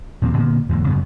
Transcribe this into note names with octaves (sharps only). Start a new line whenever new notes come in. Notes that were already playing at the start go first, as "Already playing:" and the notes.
D#2 A#2 F3 C4
A#2 D3 A#3 B3
E2 G#2 D3 A#3
F#2 C#3 B3